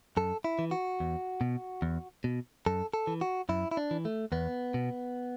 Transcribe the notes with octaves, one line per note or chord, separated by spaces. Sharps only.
F#2 A4
E4
E3
F#4
E2
B2
E2
B2
F#2 A4
A4
E3
F#4
F#2 E4
E4
D4
E3
A3
E2 B3
B2